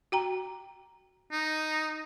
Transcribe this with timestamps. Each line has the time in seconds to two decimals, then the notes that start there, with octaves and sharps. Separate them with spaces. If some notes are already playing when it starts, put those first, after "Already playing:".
0.12 F#4 G5 A#5
1.32 D#4